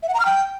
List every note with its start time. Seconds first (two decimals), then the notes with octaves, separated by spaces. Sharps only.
0.03 E5
0.08 F#5
0.14 A#5
0.20 F6
0.26 G5